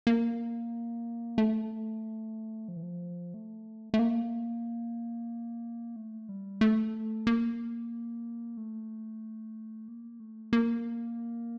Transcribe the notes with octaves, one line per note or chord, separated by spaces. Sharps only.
A#3
A3
F3
E3
F3
A3
A3
A#3
A3
G3
A3
A#3
A3
A#3
A3
A#3